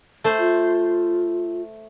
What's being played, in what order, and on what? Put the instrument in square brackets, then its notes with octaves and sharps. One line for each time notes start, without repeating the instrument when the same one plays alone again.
[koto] A3 C5
[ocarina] F4